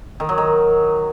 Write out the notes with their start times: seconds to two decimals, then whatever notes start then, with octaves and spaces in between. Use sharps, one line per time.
0.20 D#3
0.29 F#3
0.38 D#3